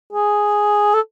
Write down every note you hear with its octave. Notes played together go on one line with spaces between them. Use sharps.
G#4
A4